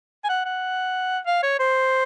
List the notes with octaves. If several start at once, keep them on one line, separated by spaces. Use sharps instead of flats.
G#5
F#5
F#5
F5
C#5
C5